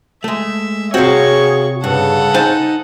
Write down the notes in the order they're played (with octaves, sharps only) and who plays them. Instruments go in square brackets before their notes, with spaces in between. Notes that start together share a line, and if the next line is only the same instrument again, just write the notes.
[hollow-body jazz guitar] G#3 A3 [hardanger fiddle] E5
[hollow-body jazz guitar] C3 C4 [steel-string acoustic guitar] F#4 F5 [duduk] G#4 [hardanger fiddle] C#5 C#6
[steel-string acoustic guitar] G2 [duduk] C#3 [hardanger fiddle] A4 F#5
[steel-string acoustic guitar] D#4 [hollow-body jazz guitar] C5 G#5 A5